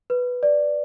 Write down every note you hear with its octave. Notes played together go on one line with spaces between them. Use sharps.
B4
D5